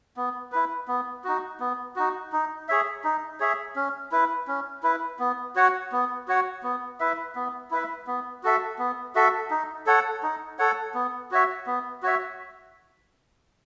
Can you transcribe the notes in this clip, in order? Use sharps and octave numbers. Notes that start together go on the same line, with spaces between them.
B3
E4 B4
B3
D#4 F#4
B3
D#4 F#4
D#4
G#4 C#5 E5
D#4
G#4 C#5 E5
C#4
E4 B4
C#4
E4 B4
B3
F#4 C#5 F#5
B3
F#4 C#5 F#5
B3
E4 B4 E5
B3
E4 B4 E5
B3
F#4 A4 E5
B3
F#4 A4 E5
D#4
A4 C#5 F#5
D#4
A4 C#5 F#5
B3
F#4 C#5 E5
B3
F#4 C#5 E5